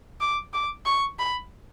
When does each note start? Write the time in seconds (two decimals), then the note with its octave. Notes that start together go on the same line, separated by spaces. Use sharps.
0.21 D6
0.53 D6
0.86 C#6
1.19 B5